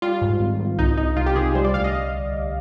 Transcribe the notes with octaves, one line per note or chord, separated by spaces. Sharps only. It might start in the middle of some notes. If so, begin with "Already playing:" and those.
G3 F4
G#2
G#1
G#1
C2 D#4
C2 D#4
C2 F4
G4
C2 G#4
G#4
G3 C5
D5
D2 F5
D#5